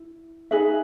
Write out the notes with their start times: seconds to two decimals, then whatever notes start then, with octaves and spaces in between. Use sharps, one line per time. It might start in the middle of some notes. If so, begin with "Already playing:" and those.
Already playing: E4
0.51 D#4 G#4 B4 E5